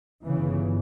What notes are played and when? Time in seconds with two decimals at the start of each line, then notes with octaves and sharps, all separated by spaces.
0.24 G1 G2 C#3 E3